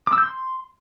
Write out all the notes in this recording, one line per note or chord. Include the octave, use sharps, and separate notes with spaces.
D6
E6
G6
C6